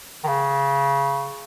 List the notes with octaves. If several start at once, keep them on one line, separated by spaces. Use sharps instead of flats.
D#3
C#3